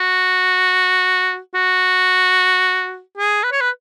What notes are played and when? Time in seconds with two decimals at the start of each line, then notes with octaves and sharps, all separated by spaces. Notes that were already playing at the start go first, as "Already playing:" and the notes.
Already playing: F#4
1.55 F#4
3.17 G#4
3.44 B4
3.52 C#5
3.61 B4